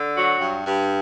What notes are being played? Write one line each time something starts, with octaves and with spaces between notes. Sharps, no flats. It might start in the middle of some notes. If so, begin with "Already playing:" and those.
Already playing: D3
F#3 F#4
G2
G2